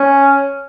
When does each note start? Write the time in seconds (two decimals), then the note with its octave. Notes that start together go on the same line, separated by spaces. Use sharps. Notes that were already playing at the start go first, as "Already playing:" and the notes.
Already playing: C#4